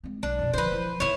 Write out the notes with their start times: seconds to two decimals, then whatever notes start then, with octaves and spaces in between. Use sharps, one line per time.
0.04 G#3 C4
0.23 B1 D4
0.39 F2 B2
0.54 D3 F3 B4 C5
0.71 E3 F3
1.00 D#3 B3 E4 C#5